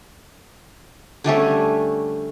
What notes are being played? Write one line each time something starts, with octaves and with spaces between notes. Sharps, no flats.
D3 G3 A3 C#4